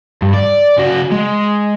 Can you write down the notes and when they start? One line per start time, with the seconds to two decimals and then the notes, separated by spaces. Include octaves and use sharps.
0.22 G2
0.34 D5
0.78 C#3 F#4
1.12 G#3